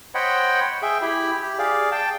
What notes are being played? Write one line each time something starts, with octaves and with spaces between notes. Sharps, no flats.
C5 C#5 D#5 F#5 G5 B5
G#4 E5 G5
E4 G4 B5
G4
G#4 D5 F5
G5 A5